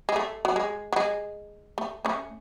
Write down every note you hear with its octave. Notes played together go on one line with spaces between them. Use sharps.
G#3
A3
F#3
G#3
F#3
G#3
A3
A3 C#4